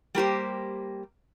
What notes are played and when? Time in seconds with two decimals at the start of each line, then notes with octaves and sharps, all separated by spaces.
0.15 G3 A#3 G4 C5